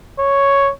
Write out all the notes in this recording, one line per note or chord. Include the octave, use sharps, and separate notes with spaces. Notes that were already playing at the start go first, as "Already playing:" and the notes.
C#5